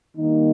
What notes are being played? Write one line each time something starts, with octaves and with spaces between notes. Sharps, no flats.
D#3 G3 A#3 D#4